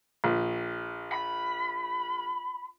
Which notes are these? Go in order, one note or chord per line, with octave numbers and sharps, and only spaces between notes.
A#1
B5